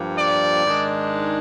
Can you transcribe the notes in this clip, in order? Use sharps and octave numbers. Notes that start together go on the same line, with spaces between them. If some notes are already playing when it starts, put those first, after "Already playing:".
Already playing: G2 F3 A#3
D5
G#2 D#3 G#3 D4